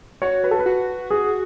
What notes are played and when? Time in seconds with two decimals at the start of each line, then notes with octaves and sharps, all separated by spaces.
0.22 F#4 C#5
0.44 B4
0.51 A4
0.59 B4
0.66 F#4
1.11 G#4